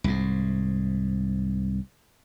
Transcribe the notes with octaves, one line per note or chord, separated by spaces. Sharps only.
C2 G#2